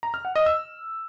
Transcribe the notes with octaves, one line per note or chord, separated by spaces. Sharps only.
A#5
F6
F#5
D#5
E6